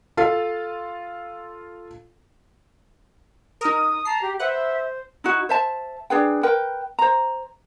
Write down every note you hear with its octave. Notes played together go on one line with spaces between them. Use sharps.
F4 A4 F5
D#4 A#4 D#6
A5 A#5 C7
G4
B4 C5 E5 F#5
D#4 E4 F#4
C5 E5 A5
D4 G#4 B4 G5
A#4 B4 G5
C5 A#5